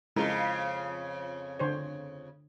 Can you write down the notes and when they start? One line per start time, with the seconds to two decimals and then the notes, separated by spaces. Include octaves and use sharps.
0.16 F2 C#3 G#3 E4 F4 A#4
1.59 D3 C5 C#5